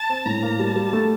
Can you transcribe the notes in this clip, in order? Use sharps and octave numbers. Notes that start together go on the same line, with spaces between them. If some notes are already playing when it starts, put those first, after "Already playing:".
Already playing: A5
C4
A2 A#5
A#3
G3 A5
G3
A3